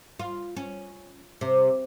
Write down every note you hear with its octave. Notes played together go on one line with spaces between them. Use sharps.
F4
C#4
C3